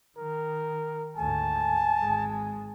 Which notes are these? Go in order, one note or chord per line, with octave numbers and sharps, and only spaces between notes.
D#3 A#4
D2 G#2 G#5 A5
G#1 G#3